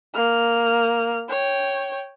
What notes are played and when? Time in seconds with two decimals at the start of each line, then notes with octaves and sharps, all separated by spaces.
0.15 A#3 F6
1.29 C#5 G5